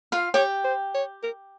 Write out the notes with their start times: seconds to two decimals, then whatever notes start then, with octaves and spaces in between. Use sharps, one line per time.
0.12 F4 F5
0.34 G4 C#5 G5
0.64 C5
0.94 C#5
1.23 A#4